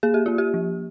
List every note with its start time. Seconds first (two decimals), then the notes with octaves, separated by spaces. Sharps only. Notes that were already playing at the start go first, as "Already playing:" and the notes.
0.03 A#3 G#4
0.14 G4
0.26 A#3 F4
0.38 G4
0.54 F3